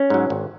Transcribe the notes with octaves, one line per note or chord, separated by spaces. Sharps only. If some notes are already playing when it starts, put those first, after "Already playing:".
Already playing: C#4
G#2 F#3
G#1